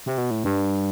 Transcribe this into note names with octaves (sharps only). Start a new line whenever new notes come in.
C3
B2
A2
G2